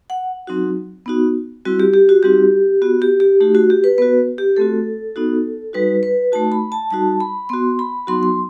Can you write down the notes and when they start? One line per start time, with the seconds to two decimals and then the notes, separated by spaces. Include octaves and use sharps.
0.10 F#5
0.47 F#3 C4 D#4 F#4
1.06 B3 D#4 F#4
1.65 G3 C4 E4 F#4
1.80 G4
1.93 G4
2.09 F#4
2.23 G3 C4 D#4 F#4 G4
2.82 B3 F#4
3.02 G4
3.20 G4
3.40 A3 D#4 F#4 G4
3.55 F#4
3.70 G4
3.84 B4
3.98 B3 F#4 B4
4.38 G4
4.56 A3 C4 F#4 A4
5.16 B3 D#4 F#4
5.73 G3 D#4 F#4 B4
6.03 B4
6.32 A3 D#4 F#4 A5
6.52 B5
6.72 A5
6.91 G3 D#4 F#4 A5
7.20 B5
7.49 B3 F#4 C6
7.79 B5
8.07 F#3 B3 D#4 F#4 C6
8.23 C6